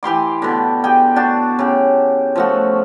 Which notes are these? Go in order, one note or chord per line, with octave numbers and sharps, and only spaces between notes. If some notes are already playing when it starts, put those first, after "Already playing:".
E3 G4 C6 D6
B2 D3
G4 G#4 G5
D4 F#4 A5
C#3 G4
F3 A3 F#4